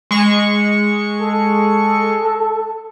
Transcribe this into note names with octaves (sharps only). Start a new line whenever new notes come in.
G#3 C#6
A4